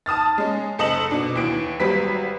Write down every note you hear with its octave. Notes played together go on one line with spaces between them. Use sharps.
A5 D#6 F6 A6
G#3 C#4
F#1 A4 D#5 E7 F#7
B2 D4
D#2 E3 D7
G#1 F#3 G3 B4 B6